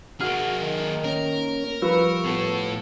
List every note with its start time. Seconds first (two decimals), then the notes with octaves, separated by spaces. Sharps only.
0.21 A#3 F#4 G#4 F6
0.61 D#3
1.04 A#3 C#4 A#4
1.82 F3 G3 B4 C#6 E6
2.24 A2 B3 A4